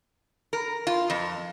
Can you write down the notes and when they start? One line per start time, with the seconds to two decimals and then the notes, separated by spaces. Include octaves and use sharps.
0.53 A#4
0.87 F4
1.10 F2